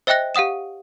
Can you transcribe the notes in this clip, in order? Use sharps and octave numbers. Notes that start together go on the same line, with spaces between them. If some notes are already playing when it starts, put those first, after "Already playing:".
C5 D#5 E5 G5 F#6 A#6
G4 F5 F#5 D#6 E7